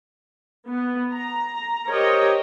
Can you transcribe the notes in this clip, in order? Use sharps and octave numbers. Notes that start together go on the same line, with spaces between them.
B3
A#5
G4 A#4 C5 C#5 D#5